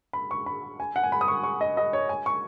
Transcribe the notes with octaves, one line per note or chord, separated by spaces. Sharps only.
B5
C#6
B5
G#5
F#5
G#5
B5
D#6
C#6
C#6
D#5
D#5
C#5
G#5
C#6